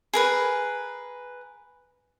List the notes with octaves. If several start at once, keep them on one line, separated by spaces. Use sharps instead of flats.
G#4 A#4 B4